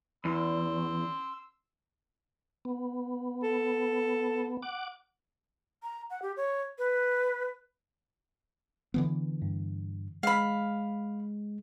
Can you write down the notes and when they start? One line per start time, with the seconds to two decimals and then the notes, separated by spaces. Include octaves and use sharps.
0.25 E2 C6 E6
2.65 B3
3.43 A4
4.63 F#5 D6
5.83 A#5
6.10 F#5
6.22 G4
6.37 C#5
6.79 B4
8.94 D3 E3 B3
9.42 G2
10.23 G#3 F5 B5